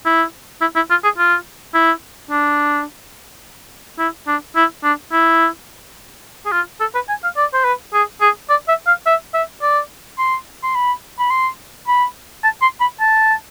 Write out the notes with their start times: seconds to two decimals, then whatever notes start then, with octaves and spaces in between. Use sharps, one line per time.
0.05 E4
0.61 E4
0.76 E4
0.90 F4
1.04 G#4
1.18 F4
1.74 E4
2.31 D4
3.99 E4
4.27 D4
4.56 E4
4.84 D4
5.12 E4
6.46 G#4
6.52 F4
6.80 A4
6.94 B4
7.09 G#5
7.23 F5
7.37 D5
7.54 C5
7.65 B4
7.94 G#4
8.21 G#4
8.50 D5
8.68 E5
8.87 F5
9.06 E5
9.34 E5
9.62 D5
10.18 C6
10.63 C6
10.75 B5
11.19 B5
11.30 C6
11.88 B5
12.43 A5
12.62 C6
12.80 B5
13.00 A5